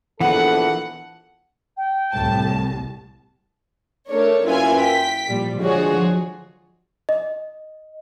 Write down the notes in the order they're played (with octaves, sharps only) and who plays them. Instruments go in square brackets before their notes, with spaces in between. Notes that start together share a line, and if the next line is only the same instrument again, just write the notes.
[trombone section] A#1 B3 A4 [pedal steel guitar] E3 B4 [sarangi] F#5
[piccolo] G5
[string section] C2 A2 A5
A3 D4 A#4 C#5
F#2 A#3 E4 F4 B4 G#5
G5 B6
A#2 F3 G3
D3 F3 G#3 F#4 G#4 C#5
[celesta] D#5